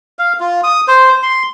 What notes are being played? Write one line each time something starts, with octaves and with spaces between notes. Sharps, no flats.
F5
F4
D#6
C5
C6